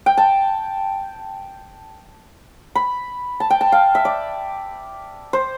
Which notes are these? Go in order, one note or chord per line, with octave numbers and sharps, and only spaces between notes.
G5
A5
B5
A5
G5
A5
F5
E5
D5
C5